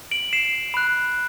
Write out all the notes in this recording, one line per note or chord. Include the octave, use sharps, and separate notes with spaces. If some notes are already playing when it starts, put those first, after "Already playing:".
D7 F#7
C7 E7
B5 F#6